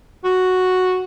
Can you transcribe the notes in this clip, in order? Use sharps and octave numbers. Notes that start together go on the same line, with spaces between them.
F#4